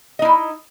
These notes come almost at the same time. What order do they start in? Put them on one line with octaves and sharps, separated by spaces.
D#5 D#4 E4